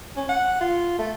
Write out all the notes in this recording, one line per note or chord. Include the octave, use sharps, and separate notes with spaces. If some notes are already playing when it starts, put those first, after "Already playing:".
C#4
F#5
F4
A3